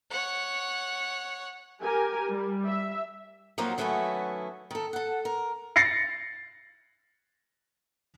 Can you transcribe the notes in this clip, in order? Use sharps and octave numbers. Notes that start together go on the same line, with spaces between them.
C#5 F#5
G4 A#4 G#5
G3
E5
F3 F#3 A#3 C4 D#4 F#4
D#3 F#3 A3 B3 C#4 E4
D#3 A4
A4 F#5
A#4
A6 A#6 C7 C#7